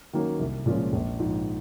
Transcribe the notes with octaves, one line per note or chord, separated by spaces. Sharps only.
D#3 F#3 A#3 C#4
C2
A#2 F3 G#3 C#4
A#1
G#2 F3